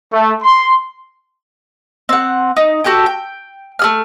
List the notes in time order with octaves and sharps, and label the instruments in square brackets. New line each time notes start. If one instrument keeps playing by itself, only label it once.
[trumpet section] A3
C6
[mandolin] C4 F#5
D#4
F#4 G4 A4 G5
G5
A3 G#4 F6